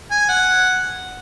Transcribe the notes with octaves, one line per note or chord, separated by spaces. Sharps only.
G#5
F#5